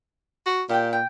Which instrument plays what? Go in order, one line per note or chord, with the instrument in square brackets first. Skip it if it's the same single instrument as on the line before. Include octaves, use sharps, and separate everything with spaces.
[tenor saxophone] F#4
[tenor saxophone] A#2 [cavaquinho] G4 G5
[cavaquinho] G5